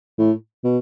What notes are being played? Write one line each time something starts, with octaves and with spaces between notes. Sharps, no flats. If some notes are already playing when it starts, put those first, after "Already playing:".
A2
B2